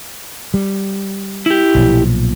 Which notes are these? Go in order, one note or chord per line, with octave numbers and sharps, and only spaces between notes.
G3
E4 G4
B1 A#2 F3